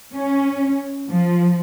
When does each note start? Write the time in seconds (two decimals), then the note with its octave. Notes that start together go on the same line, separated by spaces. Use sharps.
0.15 C#4
1.09 F3